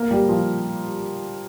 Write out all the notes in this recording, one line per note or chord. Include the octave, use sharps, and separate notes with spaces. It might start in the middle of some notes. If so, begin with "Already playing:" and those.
Already playing: A#3 A#4
G3 G4
F3 F4